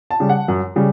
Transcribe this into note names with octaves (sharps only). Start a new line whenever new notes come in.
A5
C#3 G3
F#5
F#2
C#3 G3